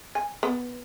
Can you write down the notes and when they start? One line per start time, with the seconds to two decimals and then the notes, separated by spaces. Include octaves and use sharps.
0.15 G#5
0.43 B3